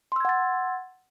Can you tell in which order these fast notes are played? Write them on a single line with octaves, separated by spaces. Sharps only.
C6 E6 G#6 F#5 A6